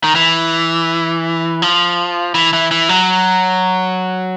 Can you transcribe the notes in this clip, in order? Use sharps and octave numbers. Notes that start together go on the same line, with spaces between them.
D#3
E3
F3
E3
E3
E3
F#3